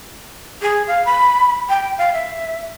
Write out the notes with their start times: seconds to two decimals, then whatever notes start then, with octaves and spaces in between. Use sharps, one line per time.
0.62 G#4
0.88 F5
1.06 B5
1.69 G5
1.98 F5
2.13 E5